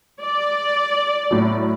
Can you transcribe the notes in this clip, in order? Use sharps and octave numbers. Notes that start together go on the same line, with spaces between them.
D5
A2 F#3